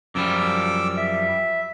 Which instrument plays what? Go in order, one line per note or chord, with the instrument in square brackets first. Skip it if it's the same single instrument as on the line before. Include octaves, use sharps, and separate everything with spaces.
[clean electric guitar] F#2 F3 G3 [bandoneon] D6 E6
[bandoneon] E5